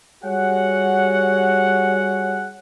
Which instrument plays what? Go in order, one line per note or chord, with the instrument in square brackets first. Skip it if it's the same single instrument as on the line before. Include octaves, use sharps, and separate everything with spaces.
[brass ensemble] G3 F#4 G#4 C#5 F#5